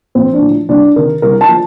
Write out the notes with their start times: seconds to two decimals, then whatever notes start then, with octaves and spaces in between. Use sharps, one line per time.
0.15 A#1 C4
0.33 D4
0.41 A2 F3
0.68 C2 D4
0.95 C3 D#3 A#4
1.22 C2 A#4
1.41 A5
1.49 F3